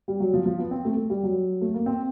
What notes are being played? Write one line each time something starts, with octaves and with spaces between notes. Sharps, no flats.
G3
F#3
F3
F3
B3
C4
A3
A3
G3
F#3
A3
A#3
C4